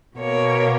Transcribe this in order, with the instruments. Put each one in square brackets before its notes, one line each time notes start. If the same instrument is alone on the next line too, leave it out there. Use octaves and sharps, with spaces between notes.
[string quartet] B2 A#3 C#5